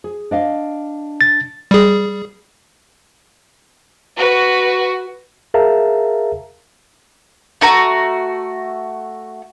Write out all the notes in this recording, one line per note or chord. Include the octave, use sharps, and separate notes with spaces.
G#4
D4 D#5 F5
A6
G3 G#4
F#4 B4
G#4 A#4 E5 F5 A5 A#5
A3 F#4 A#5